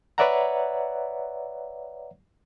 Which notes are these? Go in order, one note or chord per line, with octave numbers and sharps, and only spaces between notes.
B4 C#5 D5 E5 F#5 A#5